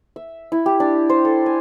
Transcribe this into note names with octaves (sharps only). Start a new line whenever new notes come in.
E5
E4
G4
D4
C5
A4
G#5